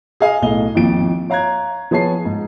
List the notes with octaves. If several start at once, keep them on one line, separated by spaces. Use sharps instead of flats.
G#4 D#5 F5 G#5
B1 A2 D#5 G7
G#1 D#2 F3 D7
C#5 F5 A#5 F#6 G#6
F3 B3 G#4 C#5 A5 C7
G#2